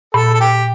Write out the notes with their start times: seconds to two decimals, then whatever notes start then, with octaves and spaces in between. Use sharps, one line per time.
0.14 A#2 A4
0.34 A4
0.40 G4